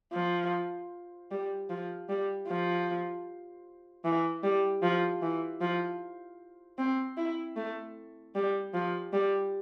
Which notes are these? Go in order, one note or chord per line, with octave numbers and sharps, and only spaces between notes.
F3
G3
F3
G3
F3
E3
G3
F3
E3
F3
C4
E4
A3
G3
F3
G3